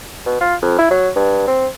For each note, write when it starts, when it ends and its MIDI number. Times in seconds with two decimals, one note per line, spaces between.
0.26 0.37 47
0.41 0.55 65
0.62 0.78 41
0.79 0.88 64
0.91 1.09 54
1.16 1.47 43
1.47 1.67 60